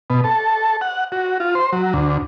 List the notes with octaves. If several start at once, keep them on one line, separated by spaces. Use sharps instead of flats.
B2
A4
F#5
F#4
F4
C5
F#3
D2